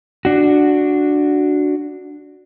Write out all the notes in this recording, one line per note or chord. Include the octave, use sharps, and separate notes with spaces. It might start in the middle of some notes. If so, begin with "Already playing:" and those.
D4 F#4